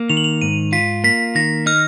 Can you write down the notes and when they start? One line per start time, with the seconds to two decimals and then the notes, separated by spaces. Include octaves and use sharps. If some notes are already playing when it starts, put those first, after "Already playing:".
Already playing: A#3
0.09 D#3 F7
0.17 F#7
0.24 F7
0.42 G#2 D#7
0.72 F4 B6
1.04 A#3 B6
1.35 D#3 A#6
1.66 D#4 F6